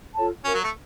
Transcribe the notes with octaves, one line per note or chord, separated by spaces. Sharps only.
F4 A4 C#5 A5
C#4 F#4 A#4 F5
F#3
A3